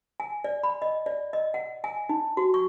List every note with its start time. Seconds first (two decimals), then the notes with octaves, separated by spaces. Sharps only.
0.20 G#5
0.44 D5
0.63 B5
0.82 D#5
1.06 D5
1.33 D#5
1.54 F#5
1.84 G#5
2.09 D#4
2.37 F#4
2.54 C#6